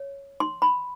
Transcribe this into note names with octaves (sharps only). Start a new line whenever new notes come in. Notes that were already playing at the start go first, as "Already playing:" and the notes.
Already playing: C#5
C6
B5